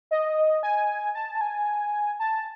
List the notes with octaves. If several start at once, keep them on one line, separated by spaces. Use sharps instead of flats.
D#5
G#5
A5
G#5
A5